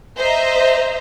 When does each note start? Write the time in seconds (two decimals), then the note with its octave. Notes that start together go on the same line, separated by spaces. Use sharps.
0.18 C5 D#5 E5 A#5